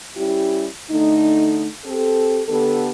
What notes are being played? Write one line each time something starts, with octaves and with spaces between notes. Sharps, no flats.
G3 C#4 E4 G4
D3 A3 D#4
C4 G4 A4
D3 B3 G4 A4